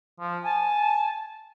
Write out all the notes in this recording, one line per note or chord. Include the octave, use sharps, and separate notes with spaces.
F3
G#5 A5